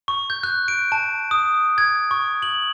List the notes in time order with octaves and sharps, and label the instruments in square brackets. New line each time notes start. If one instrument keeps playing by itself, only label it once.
[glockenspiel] C#6
G6
F#6
D7
A5
D#6
G#6
C#6
F#7